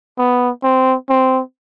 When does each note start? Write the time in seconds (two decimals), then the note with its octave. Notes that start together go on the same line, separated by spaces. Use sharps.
0.18 B3
0.64 C4
1.09 C4